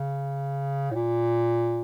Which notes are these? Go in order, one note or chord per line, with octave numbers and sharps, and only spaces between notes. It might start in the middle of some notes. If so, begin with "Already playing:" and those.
Already playing: C#3
A2
A#2